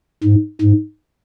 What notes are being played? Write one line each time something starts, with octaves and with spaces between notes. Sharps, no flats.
G#2
G#2